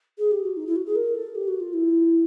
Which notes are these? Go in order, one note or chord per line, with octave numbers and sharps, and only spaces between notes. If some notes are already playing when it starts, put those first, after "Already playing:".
G#4
G4
F#4
D#4
E4
F#4
G#4
A#4
A4
G4
F#4
F4
E4